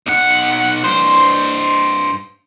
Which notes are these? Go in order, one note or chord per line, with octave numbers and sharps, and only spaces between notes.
B1 F#5
G2 C5